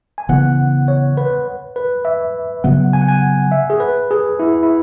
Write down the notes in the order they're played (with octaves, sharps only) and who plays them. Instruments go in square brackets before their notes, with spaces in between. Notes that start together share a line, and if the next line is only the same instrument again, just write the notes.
[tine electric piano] G#5
[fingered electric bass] C#3 E3 B3 [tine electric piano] F#5
[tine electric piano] C#5
B4
B4
E5
[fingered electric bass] C#3 F#3 B3 [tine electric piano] F#5
[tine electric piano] G#5
F#5
G#5
E5
G#4
B4
G#4
E4
E4